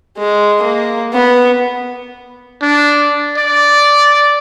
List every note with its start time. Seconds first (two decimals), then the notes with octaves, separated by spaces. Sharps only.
0.18 G#3
0.62 A#3
1.13 B3
2.62 D4
3.37 D5